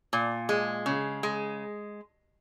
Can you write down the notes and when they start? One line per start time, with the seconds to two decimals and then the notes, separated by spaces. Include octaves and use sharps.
0.13 A#2
0.49 G#3
0.86 C#3
1.23 G#3